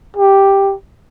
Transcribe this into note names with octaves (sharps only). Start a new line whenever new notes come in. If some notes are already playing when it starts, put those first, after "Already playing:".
G4